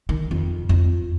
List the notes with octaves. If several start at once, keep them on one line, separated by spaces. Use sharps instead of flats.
D#3
F2
F2